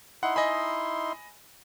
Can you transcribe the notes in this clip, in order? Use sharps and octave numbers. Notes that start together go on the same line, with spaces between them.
D#4 E4 F#5 C6
D#5 G#5 B5